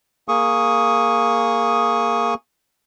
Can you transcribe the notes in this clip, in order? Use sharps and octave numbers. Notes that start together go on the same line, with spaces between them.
A#3 G#4 C#6 D#6